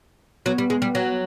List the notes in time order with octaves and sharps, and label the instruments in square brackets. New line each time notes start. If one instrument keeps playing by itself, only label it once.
[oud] F#3 [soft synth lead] B3
[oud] G3
G#3
G3
F#3